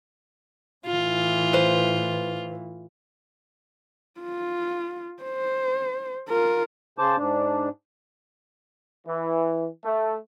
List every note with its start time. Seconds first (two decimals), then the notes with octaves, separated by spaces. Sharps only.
0.86 A2 E3 F4
1.53 B4 C5
4.21 F4
5.23 C5
6.29 F4 A#4
6.98 C#3 C5 A5 D6
7.18 G#2 D4
9.06 E3
9.84 A3